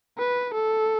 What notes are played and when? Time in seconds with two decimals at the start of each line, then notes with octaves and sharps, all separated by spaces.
0.18 B4
0.54 A4